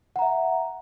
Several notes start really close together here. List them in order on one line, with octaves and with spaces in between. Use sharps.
F#5 A#5 E5